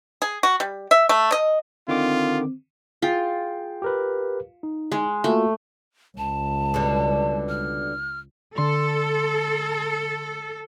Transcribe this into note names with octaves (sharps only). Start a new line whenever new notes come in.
G#4
F#4
G3
E5
A3
D#5
D3 D#3 C4 F4 D6
F4 G#4 G5
G4 A#4 B4
D#4
G#3
A3 A#3 F4 F#4
C#2 A5
B2 D3 G3
F6
D3 A4 C6